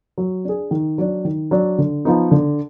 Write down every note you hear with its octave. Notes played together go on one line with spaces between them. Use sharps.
F#3
D4 G#4
D#3
F#3 D4
D#3
F#3 D4
D3
F3 B3 D#4
D3